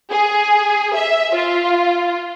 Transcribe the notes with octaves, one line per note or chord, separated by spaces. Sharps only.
G#4
E5
F4